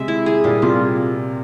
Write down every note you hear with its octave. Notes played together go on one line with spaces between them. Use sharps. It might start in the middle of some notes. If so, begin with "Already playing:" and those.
Already playing: C3 G#3 E5
E4
G#4
A#2 G3
C3 F4